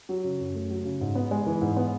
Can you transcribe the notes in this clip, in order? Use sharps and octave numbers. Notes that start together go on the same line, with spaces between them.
F#3
C#3
F#2
A3
F#3
C#3
G#2
B3
G#3
E3
G#2
B3